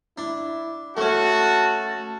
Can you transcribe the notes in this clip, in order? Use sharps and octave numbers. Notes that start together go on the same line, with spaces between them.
D4 E4
A3 C#4 F#4 A5